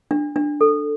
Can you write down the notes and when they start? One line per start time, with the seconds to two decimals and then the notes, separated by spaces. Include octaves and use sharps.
0.11 D4
0.36 D4
0.61 A4